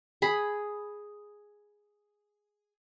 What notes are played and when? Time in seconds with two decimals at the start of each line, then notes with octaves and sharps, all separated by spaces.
0.22 G#4 B5